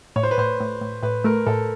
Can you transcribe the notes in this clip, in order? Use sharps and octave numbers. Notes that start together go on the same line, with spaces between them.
A2 C#5
C5
B4
A2 C5
A2
A2
A2 B4
A3 A#4
A2 A4